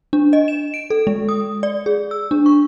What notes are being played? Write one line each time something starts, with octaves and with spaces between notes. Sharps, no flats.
D4
D#5
E7
D7
A4
G#3
D#6
D5
G#4
E6
D4
C#6